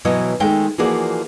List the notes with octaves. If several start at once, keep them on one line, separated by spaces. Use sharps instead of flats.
B2 E3 F#3 E4 C#5 D#5
D#3 G#3 A3 G5
E3 F3 A#3 F#4 G#4 D5